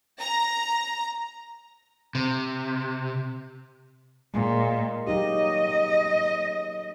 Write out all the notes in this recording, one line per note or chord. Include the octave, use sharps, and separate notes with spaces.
A#5
C3
A#2 G#3 A#3
F#3 D#4 G4 D#5